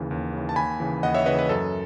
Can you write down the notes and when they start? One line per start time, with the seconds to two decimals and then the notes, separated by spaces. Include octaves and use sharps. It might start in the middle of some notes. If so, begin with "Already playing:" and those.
Already playing: D#2 C#3 E3
0.11 D#2
0.33 C#3 E3
0.49 A5
0.56 D#2 G#5 B5
0.80 C#3 E3
1.03 D#2 D#5 F#5
1.14 C#5 E5
1.26 C#3 E3 B4 D#5
1.39 B4
1.49 F#2 A4